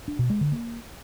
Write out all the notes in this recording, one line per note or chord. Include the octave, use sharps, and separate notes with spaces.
D4
B2
G#3
D3
A#3